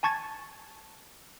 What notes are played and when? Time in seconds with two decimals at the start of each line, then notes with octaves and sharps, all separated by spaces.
0.03 G#5 A5 C#6 G#6 A6